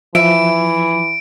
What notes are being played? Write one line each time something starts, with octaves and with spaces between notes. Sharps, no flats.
E3 F3 E5 D7